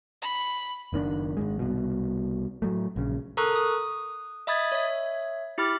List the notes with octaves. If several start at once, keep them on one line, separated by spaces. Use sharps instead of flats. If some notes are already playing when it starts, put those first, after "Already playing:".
B5
F#1 D#3 C#4 D4
G#1 E2 G#3
C2 B2
A2 F#3 A3
A#1 C#3
A4 A#4 A#5 C#6 D#6 F#6
D#6
D#5 E5 B5 D#6 G#6 A6
C#5 E5
E4 G4 B5 D6 F6 A6